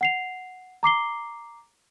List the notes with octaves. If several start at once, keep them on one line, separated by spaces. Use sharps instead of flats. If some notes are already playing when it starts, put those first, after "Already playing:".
F#5 C7 F7
A#5 D6 C7 G7